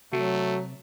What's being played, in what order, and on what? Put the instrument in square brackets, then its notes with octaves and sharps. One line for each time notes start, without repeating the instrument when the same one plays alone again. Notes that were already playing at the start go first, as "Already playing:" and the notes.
[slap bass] C3 [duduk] F#3 [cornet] A3 [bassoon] F#4